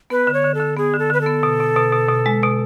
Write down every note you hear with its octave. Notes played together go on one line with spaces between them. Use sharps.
B3 B4
D3
C#5
D3
A4
D3
B3 G#4
D3
A4
D3 B4
A4
B3
B2
B2
B2
B2
B2
G#3
B2